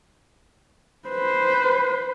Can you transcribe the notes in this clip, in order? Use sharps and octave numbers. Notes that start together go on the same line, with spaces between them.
B4 C5